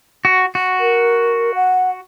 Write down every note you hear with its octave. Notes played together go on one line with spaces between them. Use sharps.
F#4
F#4
A#4
F#5